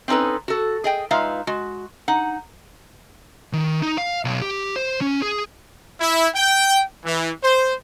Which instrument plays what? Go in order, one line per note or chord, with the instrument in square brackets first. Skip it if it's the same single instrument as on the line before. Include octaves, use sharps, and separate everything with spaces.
[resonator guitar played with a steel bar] C4 C#4 D#4 A4 B4
F#4 A4
G#4 D#5 G5
G#3 D#4 F4 B4 E5 F5
G#3 F#4
D#4 F#5
[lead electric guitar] D#3
D#4
F5
B1
G4
C5
C#4
G#4
[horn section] E4
G5
E3
C5